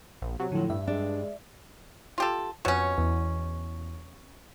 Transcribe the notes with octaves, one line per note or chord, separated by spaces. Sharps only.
A#1
C3 F#3
A2 D3 F3
G2 E5
G#3 D4
F4 G4 A4
F2 B2 C#4 C#5
E2